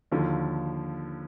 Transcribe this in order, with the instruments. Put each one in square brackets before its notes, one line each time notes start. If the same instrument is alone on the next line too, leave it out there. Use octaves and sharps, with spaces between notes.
[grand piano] D#2 D3 F3